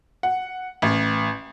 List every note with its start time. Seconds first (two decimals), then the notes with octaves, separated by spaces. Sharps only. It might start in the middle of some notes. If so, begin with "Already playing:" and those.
0.23 F#5
0.82 A1